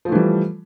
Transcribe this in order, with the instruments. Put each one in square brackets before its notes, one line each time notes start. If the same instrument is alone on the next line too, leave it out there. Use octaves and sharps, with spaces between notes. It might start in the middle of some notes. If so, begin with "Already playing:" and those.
[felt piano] F3
A3
E3
G3